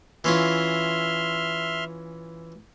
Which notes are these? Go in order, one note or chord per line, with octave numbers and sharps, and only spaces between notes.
E3 C#4 F4 E5 C6 F6